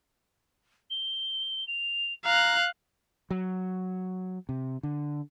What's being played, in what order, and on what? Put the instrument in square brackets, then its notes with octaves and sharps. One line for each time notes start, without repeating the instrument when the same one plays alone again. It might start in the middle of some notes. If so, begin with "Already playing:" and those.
[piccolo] G7
F7
[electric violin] F5 F#6 [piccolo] A#5
[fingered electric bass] F#3
C3
D3